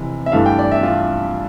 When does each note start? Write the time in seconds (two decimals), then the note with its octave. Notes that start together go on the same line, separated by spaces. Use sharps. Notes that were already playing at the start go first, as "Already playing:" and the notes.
Already playing: F1 C3 E3
0.26 E5
0.32 G2 E3 A3 F5
0.46 G5
0.59 D5
0.72 E5
0.83 F4